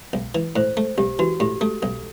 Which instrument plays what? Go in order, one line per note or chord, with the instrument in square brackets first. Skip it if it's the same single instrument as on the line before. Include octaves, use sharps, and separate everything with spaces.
[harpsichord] B1
E3
[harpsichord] A2 [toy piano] C5
[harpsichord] A3
[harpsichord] B1 [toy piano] G4
[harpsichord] E3 [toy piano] F#4
[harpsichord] A2 [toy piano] G4
[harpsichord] A3 [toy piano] A4
[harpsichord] B1 [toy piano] A4